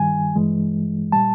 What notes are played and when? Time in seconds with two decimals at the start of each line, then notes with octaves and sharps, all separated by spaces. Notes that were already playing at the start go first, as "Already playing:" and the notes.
Already playing: G2 D#3 G3 G#5
0.36 G2 E3 G#3
1.12 A#2 G3 A5